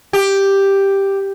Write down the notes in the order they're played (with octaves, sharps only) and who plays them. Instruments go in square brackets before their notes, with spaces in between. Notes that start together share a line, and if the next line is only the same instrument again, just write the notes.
[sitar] G4